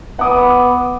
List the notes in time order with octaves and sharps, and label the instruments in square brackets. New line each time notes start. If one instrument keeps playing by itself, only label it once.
[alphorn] B3 [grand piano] F#5 D6 D#6